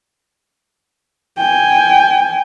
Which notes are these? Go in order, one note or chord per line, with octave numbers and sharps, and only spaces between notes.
G5 G#5